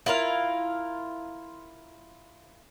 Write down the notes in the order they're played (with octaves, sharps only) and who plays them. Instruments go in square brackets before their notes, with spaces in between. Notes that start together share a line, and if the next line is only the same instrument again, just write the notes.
[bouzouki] E4 F4 A#4 F5